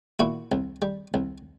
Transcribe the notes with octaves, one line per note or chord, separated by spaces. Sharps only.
A#2 E4 F#4
C2
G3
C2